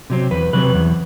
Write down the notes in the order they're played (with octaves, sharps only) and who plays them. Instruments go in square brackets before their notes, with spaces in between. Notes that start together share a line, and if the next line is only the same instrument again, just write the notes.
[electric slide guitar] C3 F#3 C4
E2 B4
C3 F#3 C4 B4
E2